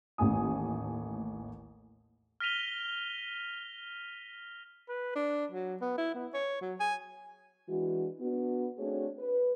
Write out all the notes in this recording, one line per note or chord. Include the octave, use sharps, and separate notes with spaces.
A1 D#2 A3 G#5 D#6
F6 A#6 B6 D#7 F7 G7
B4
D4
F#3
B3
E4
B3
C#5
F#3
G#5
E3 G#3 D4 F#4
B3 D4 F#4
A3 C4 D4 F#4 G#4 C#5
B4